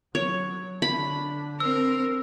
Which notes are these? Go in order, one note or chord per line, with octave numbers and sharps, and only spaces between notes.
F#3 C#5
D3 D4 B5
C4 A#4 E6